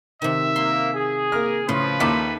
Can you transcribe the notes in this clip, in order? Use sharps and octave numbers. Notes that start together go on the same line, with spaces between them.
C3 D#3 E5
A#3 C6
G#4
A#3 A#4 F6
A2 C#3 F3 B4 F5 C6
D#2 D#4 E4 A4 D6 B6